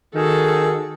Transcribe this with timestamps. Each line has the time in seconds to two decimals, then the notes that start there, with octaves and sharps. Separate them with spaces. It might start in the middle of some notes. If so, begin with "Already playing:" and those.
0.15 D#3 F#4 G#4 A4